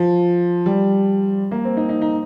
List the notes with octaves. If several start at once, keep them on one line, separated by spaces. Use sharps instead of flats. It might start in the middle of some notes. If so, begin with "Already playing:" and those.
Already playing: F3
G3
A#3
C4
D#4
D#4
D#4